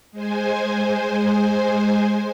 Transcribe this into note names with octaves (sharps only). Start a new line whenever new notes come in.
G#3 C5 G#5